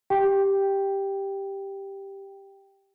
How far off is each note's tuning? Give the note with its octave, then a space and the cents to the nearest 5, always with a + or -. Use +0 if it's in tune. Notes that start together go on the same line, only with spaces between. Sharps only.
G4 +0 G5 +0